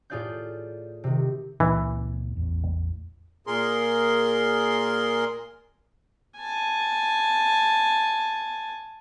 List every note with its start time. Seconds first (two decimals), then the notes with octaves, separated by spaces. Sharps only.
0.10 A2 F4 G#4 D5 F5 G6
1.04 C3 D#3
1.60 C#2 A#2 E3 C4
2.37 A1 E2
3.47 A#2 G#4 A#4 C6
6.38 G#5 A5